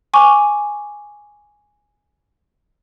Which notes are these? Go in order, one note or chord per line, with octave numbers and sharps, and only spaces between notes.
G#5 C#6 D6